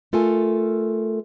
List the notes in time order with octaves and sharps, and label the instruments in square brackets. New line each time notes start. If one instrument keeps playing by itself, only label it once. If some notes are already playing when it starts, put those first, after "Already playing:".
[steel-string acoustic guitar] A3 F4 A4 A#4 G#5